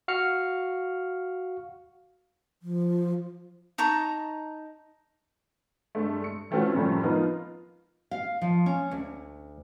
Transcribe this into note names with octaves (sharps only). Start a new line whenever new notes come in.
F#4 F5 F6 C#7
F3
D#4 A5 A#5 C#6
G2 G#3 A3
C#7
E3 A3 C4 C#4 F4 F#4
F#2 A2 F3 G3 A3 C4
F3 B3 D#4 F4 A#4 B4
F5
F3
C#4
D2